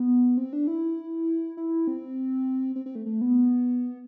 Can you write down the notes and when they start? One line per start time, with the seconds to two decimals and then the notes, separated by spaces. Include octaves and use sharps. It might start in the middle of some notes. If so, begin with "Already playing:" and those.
Already playing: B3
0.37 C4
0.53 D4
0.67 E4
1.57 E4
1.87 C4
2.76 C4
2.86 C4
2.95 A3
3.06 A3
3.21 B3